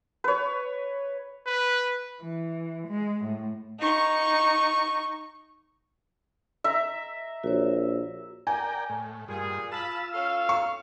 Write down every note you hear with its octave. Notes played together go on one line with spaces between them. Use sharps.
B4 C#5
B4
E3
G#3
A2
D#4 C#6
E5 A#5
A#1 F#4 C#5
A#4 D5 G5 G#5
A2
G2 A#2 G#4
F4 A5 B5 E6
C#4 A4 F5
C#6